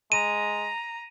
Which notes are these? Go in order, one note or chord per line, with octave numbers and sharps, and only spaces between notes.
G#3 A#5 D#7